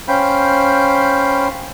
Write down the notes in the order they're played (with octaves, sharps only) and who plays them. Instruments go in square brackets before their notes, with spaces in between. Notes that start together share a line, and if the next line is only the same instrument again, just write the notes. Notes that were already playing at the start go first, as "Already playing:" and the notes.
[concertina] C#4 C5 F5 G5 B5